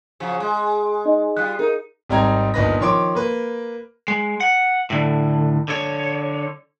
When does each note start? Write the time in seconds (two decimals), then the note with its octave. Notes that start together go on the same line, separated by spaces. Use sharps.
0.20 C#3 F3 F#3
0.40 G#3
1.05 D#4 D#5
1.37 G3 F4 F#6
1.59 D#4 G#4 A#4
2.10 G#1 G3 C4 D#4 A#5 G#6
2.54 G1 A#2 D#4 B4 B5 A#6
2.80 D#3 F3 C#5 C6 D6 D7
3.15 A#3 B4
4.08 G#3
4.40 F#5
4.90 A2 D3
5.68 D3 C#5